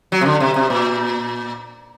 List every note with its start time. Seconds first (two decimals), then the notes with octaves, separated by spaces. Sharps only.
0.12 F#3
0.21 C3
0.26 D3
0.40 C3
0.56 C3
0.70 A#2